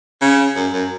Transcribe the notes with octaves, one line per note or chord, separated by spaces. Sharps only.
C#3
F#2
F#2